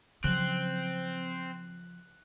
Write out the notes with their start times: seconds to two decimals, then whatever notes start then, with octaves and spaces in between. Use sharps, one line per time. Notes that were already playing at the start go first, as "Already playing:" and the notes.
0.24 C#3 F3 F#3 C4 F#6 F#7